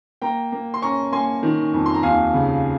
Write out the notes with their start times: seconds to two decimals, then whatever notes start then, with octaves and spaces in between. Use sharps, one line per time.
0.22 A#3 G5 A#5
0.52 A#3
0.74 C6
0.82 C#4 A#5 C#6
1.12 A#3 G#5 C6
1.43 D#3
1.74 F2
1.86 C6
1.94 A#5
2.03 D#2 F5 G#5
2.34 C#3